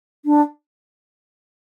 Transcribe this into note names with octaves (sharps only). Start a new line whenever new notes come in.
D4